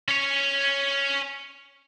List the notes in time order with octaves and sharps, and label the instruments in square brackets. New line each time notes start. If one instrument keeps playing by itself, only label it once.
[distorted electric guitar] C#4 C#5